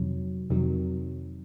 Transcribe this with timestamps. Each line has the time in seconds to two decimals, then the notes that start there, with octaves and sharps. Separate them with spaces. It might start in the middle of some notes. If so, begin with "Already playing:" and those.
Already playing: F2 C3 D#3 F#3
0.50 F2 C3 D#3 F#3